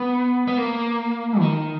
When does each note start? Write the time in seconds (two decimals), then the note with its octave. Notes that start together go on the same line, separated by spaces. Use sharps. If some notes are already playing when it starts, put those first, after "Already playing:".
Already playing: B3
0.48 B3
0.58 A#3
1.40 D#3